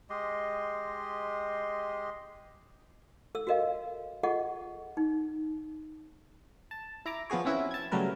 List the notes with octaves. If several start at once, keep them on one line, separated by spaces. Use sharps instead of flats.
G#3 G4 D#5 C6
A4 E6
F#4 A4 A#4 D#5 F5
F4 G#4 A4 D#5 F#5 C#6
D#4
A5
E4 A#5 D6
F3 B3 F#4 G#4 C#5
C4 C#4 E4 F#4
A5 G#6
C#3 F#3 G3 A3 A#4 B4